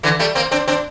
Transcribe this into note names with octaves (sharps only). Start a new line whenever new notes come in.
D3 E3
G3 A3
A#3 C4
C4 D4
C4 D4